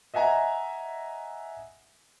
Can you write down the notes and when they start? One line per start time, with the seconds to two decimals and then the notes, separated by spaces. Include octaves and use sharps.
0.14 D#5 E5 F#5 G#5 A#5